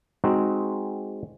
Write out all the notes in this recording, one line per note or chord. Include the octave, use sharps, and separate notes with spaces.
G#3 C4 D#4 F#4